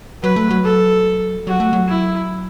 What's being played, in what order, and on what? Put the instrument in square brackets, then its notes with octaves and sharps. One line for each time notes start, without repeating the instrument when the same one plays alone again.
[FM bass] F#3 [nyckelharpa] B4
[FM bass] A3
F#3
[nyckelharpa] A4
[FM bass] F#3 [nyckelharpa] F#4
[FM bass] A3
F#3
[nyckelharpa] E4